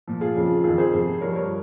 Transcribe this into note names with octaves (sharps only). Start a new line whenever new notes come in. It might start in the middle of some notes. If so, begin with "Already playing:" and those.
A#2 F3
F4 G#4
F2 C#3 F3
F2 D#3 F4 G#4
G#4 C5
F2 C3 F3
G2 F3 A#4 C#5
A#4 C#5